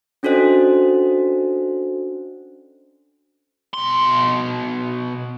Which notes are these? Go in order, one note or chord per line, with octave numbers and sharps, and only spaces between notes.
C#4 D4 F#4 A4 C5 D#5
B2 C6